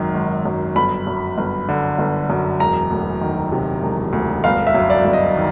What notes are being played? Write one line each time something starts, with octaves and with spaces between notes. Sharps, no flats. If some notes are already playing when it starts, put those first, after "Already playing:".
Already playing: G#1 F#2 D#3
G#1
F#2
G1 B5
F#2
G1
D3
G1
F#2
E1 A#5
D2
D#3
C3
E1
D2
G1 F5
E5
F#2
D5
G1
D#5
D#3